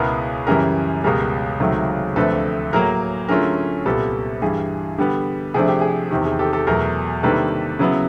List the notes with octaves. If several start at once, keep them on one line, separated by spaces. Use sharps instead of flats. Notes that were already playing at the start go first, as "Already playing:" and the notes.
Already playing: C#2 B2 G#3 B3 E4 G#4 A#4
F#2 C#3 E3 G3 G#4 A#4
C#2 B2 G3 G#4 A#4
C#2 C3 D#3 F#3 A3
D2 C3 F3 A3 D4 A4 B4
A2 F#3 A#3 G#4 A#4
D3 F#3 A3 C#4 F4 G#4 A#4
C2 A#2 G3 B3 G4 A4
G2 E3 G3 G#4
D3 G3 B3 G4
C3 F3 A3 D4 G#4
G4
G#4
E2 C3 D#3 G4
G#4
G4 A4
G4 A4
E2 B2 F#3 A3 G#4 A#4
C3 D#3 G3 A#3 D4 A4 B4
C#3 F#3 B3 E4